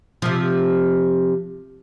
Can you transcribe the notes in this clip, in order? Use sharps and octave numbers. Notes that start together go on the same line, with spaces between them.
C3 F3